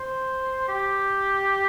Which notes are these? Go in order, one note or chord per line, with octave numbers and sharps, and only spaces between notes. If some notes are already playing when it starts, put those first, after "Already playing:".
Already playing: C5
G4